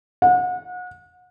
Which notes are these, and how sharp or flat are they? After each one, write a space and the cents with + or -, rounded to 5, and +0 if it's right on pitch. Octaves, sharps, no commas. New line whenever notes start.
F#5 -35